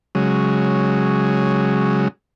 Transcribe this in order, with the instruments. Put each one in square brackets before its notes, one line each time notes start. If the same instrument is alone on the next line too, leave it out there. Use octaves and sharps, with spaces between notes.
[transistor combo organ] C#3 F#3 G#3